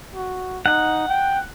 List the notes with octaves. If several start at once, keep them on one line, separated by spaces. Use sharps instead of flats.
F#4
D#4 F#5
G5